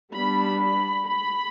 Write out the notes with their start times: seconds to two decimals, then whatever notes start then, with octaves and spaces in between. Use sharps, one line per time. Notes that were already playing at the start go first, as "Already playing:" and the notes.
0.14 G3 B3 D4 B5
0.61 B5
1.07 B5